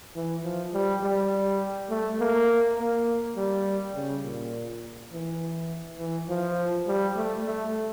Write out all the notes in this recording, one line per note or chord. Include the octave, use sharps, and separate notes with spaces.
E3
F3
G3
G3
A3
A#3
A#3
G3
C#3
A#2
E3
E3
F3
G3
A3
A3